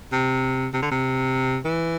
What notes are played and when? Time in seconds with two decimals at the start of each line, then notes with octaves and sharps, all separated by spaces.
0.12 C3
0.74 C3
0.82 D3
0.91 C3
1.65 E3